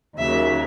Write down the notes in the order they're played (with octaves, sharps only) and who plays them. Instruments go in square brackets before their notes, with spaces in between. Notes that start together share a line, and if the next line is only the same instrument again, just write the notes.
[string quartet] D#2 C#3 F#3 A#3 E5